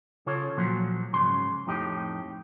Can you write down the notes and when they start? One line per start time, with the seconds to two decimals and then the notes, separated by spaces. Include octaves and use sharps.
0.26 C#3 F4 A4 C#5
0.57 A#2 F3 F#3
1.13 G#2 C#3 C6
1.67 F2 A2 D#4 G4